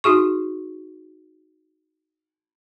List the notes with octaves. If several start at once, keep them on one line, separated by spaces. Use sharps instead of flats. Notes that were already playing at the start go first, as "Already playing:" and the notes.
D#4 F#4 G#4 C#6